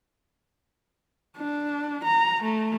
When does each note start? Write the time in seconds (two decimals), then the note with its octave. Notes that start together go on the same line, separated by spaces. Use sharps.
1.37 D4
2.04 A#5
2.43 A3